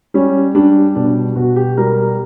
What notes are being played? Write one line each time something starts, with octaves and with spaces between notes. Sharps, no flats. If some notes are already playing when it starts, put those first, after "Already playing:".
G3 C#4
G3 D4
B2 D4
B2 F#4
G4
G3 A#4